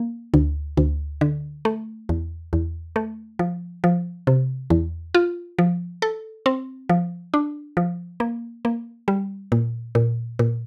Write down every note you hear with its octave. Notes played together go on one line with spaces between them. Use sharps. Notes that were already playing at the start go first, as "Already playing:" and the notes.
Already playing: A#3
D2
D2
D3
A3
E2
E2
A3
F3
F3
C3
E2
F4
F3
A4
C4
F3
D4
F3
A#3
A#3
G3
A#2
A#2
A#2